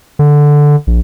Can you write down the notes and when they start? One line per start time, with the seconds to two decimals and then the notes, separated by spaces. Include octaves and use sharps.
0.19 D3
0.87 A#1